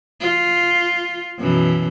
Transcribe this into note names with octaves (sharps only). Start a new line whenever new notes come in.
F4
F#2 B2 E3